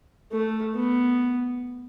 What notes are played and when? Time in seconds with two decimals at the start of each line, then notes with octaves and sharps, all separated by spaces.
0.32 A3
0.75 B3